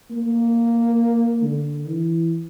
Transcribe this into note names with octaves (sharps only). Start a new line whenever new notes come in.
A#3
D3
E3